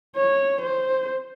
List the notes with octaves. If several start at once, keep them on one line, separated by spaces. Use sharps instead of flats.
C#5
C5